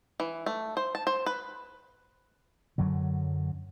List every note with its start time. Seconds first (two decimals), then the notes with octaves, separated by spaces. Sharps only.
0.20 E3
0.46 A3
0.77 C5
0.95 A5
1.07 C5
1.26 B4
2.78 F#2 D3 F#3